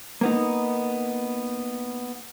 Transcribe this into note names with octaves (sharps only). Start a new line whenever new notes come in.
A#3 B3 D#4